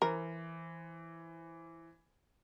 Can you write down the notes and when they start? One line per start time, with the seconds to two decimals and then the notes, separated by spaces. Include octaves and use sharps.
0.02 E3 A#4 C5